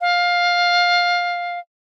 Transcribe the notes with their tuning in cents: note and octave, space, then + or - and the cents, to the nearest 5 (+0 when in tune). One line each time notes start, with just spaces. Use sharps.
F5 +15